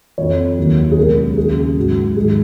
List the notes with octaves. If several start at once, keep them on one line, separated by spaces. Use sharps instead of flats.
F2 F3 C#5
D#2 D#3 F#3
G#4
C#2 B2 F#3 A#4
D#2 C#3 F#3 G#4
G#2 F#3 F#4
G#2 D#3 F#3 G#4